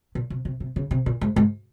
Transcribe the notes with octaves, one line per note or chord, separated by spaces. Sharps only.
A#2
C3
C3
C3
C#3
C3
A#2
G#2
G#2